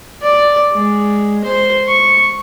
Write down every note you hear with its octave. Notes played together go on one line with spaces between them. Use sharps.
D5
G#3
C5
C#6